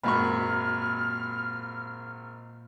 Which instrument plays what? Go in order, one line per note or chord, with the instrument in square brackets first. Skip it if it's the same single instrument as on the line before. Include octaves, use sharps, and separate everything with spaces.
[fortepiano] G#1 F#2 C#6 [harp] A#2 [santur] B5 [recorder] F6